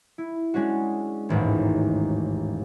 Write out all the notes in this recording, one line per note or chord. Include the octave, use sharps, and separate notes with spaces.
E4
G#3 C#4 D4 F#4
E1 A1 D#2 G#2